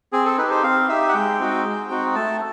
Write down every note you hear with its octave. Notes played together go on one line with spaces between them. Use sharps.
C4 G#4
A4
D#4 G4 B4
C5
C4 F5
D#4 G4 E5
F#5
G#3 G5
C4 D#4 F#4
G#3
C4 D#4 F#4
A3 A5